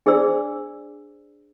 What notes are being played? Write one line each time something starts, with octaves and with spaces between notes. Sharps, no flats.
D4 G#4 C5 D5 E6